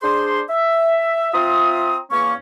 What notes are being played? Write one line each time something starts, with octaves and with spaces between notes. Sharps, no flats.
D4 G#4 C5 C6
E5
C4 F4 E5 A#5 D#6
E2 A#3 C#4 C#6